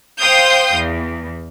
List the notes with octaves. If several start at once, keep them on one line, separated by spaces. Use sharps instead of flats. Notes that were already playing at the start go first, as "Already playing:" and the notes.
C5 F5 G5 C6 D#6 G6
E2